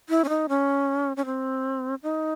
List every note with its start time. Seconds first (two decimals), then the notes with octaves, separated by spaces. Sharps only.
0.09 E4
0.24 C#4
0.29 D#4
0.49 C#4
1.17 C#4
1.25 C4
2.03 D#4